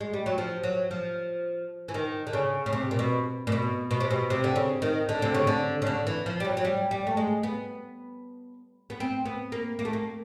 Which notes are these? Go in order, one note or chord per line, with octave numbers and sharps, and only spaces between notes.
G#3
G3
F#3
F3
F#3
F3
E3
D#3
D3
C#3
C#3
C3
A#2
B2
A#2
B2
B2
C3
B2
C3
D3
C#3
D#3
D3
C3
C#3
D3
C#3
D3
E3
F3
G3
F#3
F#3
G3
G3
A3
G#3
B3
B3
C4
B3
A#3
A#3
A3
A#3